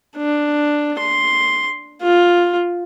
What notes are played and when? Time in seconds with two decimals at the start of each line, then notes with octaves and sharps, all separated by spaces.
0.17 D4
0.99 C6
2.01 F4